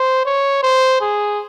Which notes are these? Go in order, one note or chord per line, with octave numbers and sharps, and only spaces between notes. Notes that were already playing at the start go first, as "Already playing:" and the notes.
Already playing: C5
C#5
C5
G#4